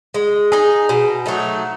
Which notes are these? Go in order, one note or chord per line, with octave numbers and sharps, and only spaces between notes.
G#3
D#4 G#4
B2
F#3 A3 D#4